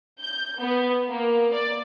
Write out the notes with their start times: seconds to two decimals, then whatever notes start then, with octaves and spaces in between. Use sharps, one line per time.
0.20 G6
0.60 B3
1.08 A#3
1.53 D5